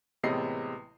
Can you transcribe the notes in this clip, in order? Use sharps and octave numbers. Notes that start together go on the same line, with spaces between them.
A1 C3 G#3 B3 D#5 C7